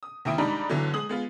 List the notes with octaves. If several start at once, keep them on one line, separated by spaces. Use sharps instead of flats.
D#6
D#2 C3 C4 E4 D#6 D7
G#2 G3 D4 D#4 A#5 B5
G1 D3 E3 F#3
G#3 D#6 F#7
G#3 B3 F4